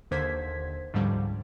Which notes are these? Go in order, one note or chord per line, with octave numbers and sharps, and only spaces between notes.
D#2 D3 C5 G#6 B6
C#2 G#2 D3 F3 G3